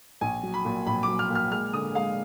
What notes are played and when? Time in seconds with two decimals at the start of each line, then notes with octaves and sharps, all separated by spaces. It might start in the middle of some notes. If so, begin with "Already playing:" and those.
0.21 A#1 G#5
0.43 F#3
0.54 B5
0.65 A#2
0.86 A#1 B5
1.03 D6
1.08 F#3
1.19 F6
1.30 A#2
1.35 F6
1.52 G#3 F6
1.73 D3 D#6
1.95 G#3 F5